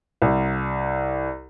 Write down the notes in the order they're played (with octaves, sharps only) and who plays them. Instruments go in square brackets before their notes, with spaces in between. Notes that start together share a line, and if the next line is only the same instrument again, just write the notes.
[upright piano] C2